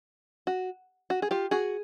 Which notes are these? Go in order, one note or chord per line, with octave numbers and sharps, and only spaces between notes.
F#4
F#4
G#4
F4 G4
F#4 G#4